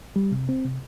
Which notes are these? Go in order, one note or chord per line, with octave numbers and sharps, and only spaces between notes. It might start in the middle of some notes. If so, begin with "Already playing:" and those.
G3
C3
C4
C3